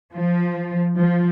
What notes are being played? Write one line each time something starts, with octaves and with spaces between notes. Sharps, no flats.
F3
F3